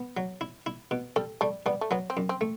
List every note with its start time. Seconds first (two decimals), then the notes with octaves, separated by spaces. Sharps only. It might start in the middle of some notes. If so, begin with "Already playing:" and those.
Already playing: B3
0.17 F#3
0.41 E4
0.66 E4
0.91 B2
1.16 G3 A4
1.41 G3 A3
1.66 G3 B3
1.81 A3
1.91 F#3 B3
2.10 C4
2.17 F#2
2.29 C4
2.41 A3